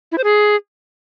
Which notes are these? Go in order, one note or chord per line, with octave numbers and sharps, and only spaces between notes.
E4
C5
G#4